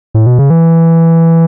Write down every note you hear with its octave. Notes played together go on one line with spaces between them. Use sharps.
A2
B2
C#3
E3